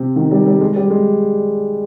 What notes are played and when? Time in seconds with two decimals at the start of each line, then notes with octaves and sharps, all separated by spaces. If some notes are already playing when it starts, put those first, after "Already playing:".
Already playing: C3
0.16 D#3
0.31 G3
0.46 G3
0.61 G#3
0.76 G3
0.90 G#3